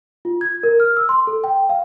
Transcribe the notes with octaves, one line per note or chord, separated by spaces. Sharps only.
F4
G#6
A#4
F6
E6
C6
A4
G5
F5